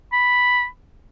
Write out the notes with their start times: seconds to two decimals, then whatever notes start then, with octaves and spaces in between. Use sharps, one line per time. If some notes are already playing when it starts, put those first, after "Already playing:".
0.13 B5